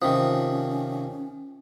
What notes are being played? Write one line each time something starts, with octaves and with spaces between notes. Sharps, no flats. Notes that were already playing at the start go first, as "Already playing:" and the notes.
C3 D#3 F3 C#4 F4 C5 D#6